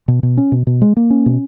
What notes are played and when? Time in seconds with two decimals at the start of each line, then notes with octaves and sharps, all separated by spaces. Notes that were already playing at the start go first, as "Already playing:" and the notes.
0.08 B2
0.23 B2
0.37 C#4
0.52 B2
0.67 B2
0.82 G#3
0.97 A#3
1.10 C#4
1.26 B2